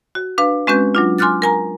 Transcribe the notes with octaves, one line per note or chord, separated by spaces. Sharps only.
F#4
D4 B4 F5
G#3 C4 C#4 F#4 B4 G6
F#3 D4 F4
G#5 C6 D6 F6 F#6 A6
A#4 G#5 A#5